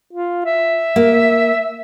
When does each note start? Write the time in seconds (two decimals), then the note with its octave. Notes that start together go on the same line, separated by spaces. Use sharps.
0.13 F4
0.45 E5
0.96 A#3